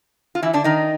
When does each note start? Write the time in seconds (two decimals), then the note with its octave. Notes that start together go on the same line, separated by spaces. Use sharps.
0.35 F4
0.42 E3 E4
0.53 D3 D4
0.64 D#3 D#4